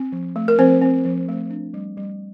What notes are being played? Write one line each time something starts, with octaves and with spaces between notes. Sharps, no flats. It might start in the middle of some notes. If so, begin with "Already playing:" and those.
Already playing: C4
F3
A3
A#4
F3 C4 C5
C4
F3
A3
D4
G3
G3